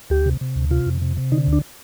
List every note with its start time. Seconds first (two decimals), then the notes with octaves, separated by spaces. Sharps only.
0.10 D2 G4
0.26 C3
0.41 C3
0.56 D2
0.71 C3 F4
0.86 F2
1.02 C3
1.17 C3
1.32 D3 D#4
1.47 D2
1.53 D4